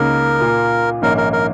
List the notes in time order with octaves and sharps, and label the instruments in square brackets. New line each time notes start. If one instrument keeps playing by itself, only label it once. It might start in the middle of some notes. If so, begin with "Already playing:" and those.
Already playing: [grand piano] C#2 C#3 A#3 D#4 [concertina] A#4
[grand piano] A#2 A#3 F4
[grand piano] A#1 G#2 D#3 A#3 C#4 [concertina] A#4
[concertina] A#4
A#4